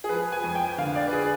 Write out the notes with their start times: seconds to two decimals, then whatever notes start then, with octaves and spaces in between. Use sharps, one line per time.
0.04 G#4
0.09 F3 B4
0.32 G#5
0.44 F2
0.55 G5
0.78 D3 F5
0.95 D5
1.08 B4
1.13 G#4